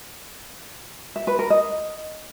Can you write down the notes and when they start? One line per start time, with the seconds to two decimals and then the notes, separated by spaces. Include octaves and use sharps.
1.16 E5
1.27 B4
1.39 A#4
1.50 D#5